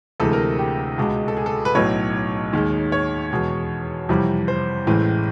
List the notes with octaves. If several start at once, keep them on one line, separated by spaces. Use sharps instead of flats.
D2 C3 E3 G#3 A4
A#4
G4
C#2 B2 G#3
A4
G#4
A4
B4
B1 A2 F#3 C#5
D#2 D#3 G#3
C#5
E2 B2 G#3
F2 C3 E3 G3
C5
A1 A2 E3 G#3